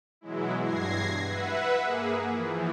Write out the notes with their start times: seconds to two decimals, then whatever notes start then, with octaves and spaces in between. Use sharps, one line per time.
0.21 B2 E3 F#3 G#3 E4
0.62 G2 G#6 A#6 C7
1.22 B4 E5 F#5
1.82 A#3 G#4
2.27 E3 F3